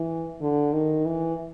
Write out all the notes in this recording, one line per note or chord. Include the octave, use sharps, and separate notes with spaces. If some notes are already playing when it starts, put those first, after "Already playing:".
Already playing: E3
D3
D#3
E3